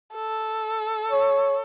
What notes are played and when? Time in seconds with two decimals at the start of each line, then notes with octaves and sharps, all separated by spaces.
0.15 A4
1.12 C#5